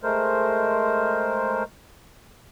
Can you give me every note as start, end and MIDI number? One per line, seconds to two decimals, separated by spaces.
0.03 1.63 56
0.03 1.63 57
0.03 1.63 70
0.03 1.63 72